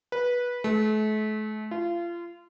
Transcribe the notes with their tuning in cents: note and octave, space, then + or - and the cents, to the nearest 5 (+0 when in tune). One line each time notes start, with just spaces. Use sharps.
B4 -15
A3 -40
F4 -30